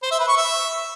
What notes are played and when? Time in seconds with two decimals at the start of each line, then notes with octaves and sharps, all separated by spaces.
0.03 C5
0.11 E5
0.20 B4
0.28 C#6
0.37 E5